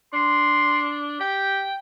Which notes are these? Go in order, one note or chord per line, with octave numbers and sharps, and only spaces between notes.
D4 C6
G4 G5